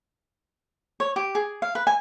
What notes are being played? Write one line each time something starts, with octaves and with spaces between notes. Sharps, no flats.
C#5
G4
G#4
F5
B4
G#5